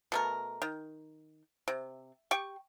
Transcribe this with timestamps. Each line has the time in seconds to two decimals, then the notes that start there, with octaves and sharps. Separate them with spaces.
0.12 B2 A3 A#4
0.62 D#3
1.68 C3
2.31 G4 G5 C#6